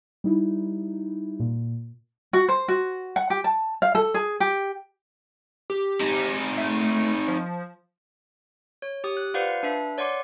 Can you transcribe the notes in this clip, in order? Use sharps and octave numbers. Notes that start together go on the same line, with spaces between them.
G3 D#4 E4
A#2
F#4
C5
F#4
F#5
G4
A5
F5
A4
G#4
G4
G4
C4 D#4
A3
F3
C#5
G4 D#6
F#6
F4 B4 C5 D5 F5 F#5
D4 B4 E5
C#5 D5 F#5 C6 D6